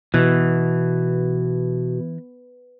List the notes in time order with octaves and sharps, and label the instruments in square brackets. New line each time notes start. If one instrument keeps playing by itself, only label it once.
[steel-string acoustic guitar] B2 [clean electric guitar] E3